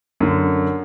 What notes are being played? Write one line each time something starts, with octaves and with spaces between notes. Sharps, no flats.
F#2 D3